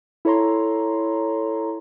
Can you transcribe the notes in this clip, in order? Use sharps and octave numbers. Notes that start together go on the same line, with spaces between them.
E4 A4 C#5 A#5 C6